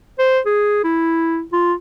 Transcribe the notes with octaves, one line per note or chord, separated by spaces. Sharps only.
C5
G#4
E4
F4